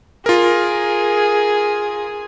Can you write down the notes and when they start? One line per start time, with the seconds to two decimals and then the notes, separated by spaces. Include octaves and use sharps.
0.26 F4 G#4 A#4